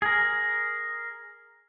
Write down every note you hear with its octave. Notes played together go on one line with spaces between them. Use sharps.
G#4 A#4